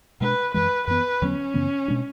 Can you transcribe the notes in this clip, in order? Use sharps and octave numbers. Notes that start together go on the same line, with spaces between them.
B2 G#3 D4 B4
F#2 E3 G#3 B4
F#2 E3 B3 B4
E2 D3 F#3 B3 C#4
F#2 C#3 E3 B3
B2 G#3 D4